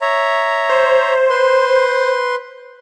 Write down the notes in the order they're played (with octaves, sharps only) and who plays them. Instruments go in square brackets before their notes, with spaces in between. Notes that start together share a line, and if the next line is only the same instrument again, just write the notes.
[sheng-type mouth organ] C#5 E5 A#5
[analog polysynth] C5
[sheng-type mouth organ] B4 C6